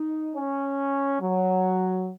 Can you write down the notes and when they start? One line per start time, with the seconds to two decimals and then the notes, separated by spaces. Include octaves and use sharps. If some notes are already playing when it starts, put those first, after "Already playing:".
Already playing: D#4
0.35 C#4
1.21 F#3